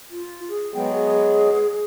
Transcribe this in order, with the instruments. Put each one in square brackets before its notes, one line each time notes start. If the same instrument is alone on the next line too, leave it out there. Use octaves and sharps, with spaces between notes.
[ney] F4
G#4
[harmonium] F#3 G#3 B3 [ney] G5
[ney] G#4